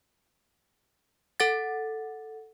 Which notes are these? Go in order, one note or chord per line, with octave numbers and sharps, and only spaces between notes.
A4 F#5 A6